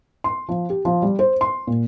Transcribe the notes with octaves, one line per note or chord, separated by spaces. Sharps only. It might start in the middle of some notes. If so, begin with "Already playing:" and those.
C6
F3
G4
F3
G3
C5
C6
A#2